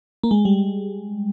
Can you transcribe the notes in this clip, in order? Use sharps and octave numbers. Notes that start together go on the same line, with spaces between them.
A#3
G#3
G3